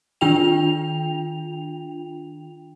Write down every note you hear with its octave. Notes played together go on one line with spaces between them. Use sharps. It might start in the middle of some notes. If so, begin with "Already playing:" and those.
D#3 D4 F4 G5 F7